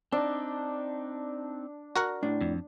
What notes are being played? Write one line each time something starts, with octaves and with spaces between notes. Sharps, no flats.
C4 D4 D#4
F#4 A#4 F#5
A2 D4
F2